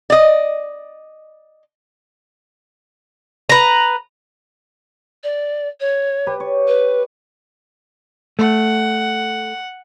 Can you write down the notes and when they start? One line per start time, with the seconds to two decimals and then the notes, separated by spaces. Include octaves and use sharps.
0.10 D5 D#5
3.49 B4 A#5
5.24 D5
5.80 C#5
6.27 G4 B4 D5
6.40 C#5
6.68 B4
8.39 A3 F#5